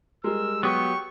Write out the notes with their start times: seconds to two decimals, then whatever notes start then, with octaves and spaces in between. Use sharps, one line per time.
0.24 G3 G#3 A#4 E6
0.63 F#3 B3 G4 C#6